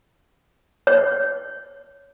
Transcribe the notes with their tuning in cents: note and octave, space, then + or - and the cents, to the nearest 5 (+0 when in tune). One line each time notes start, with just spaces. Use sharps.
C#5 +10